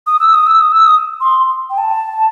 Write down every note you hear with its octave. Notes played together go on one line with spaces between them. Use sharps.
D#6
E6
D#6
E6
D#6
E6
D#6
C6
G5
A5